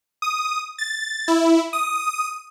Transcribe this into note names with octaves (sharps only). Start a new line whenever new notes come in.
D#6
A6
E4
D#6